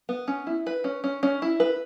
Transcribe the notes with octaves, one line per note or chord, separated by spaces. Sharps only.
B3
C#4
E4
B4
C#4
C#4
C#4
E4
B4